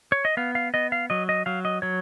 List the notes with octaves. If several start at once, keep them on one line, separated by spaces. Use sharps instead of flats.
C#5
D#5
B3 F5
F5
B3 D#5
F5
F#3 D#5
D#5
F#3 F5
D#5
F#3 C#5